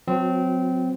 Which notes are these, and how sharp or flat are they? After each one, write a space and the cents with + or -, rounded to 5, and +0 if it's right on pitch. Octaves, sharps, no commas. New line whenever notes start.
F#3 -25 C4 -20 F4 +40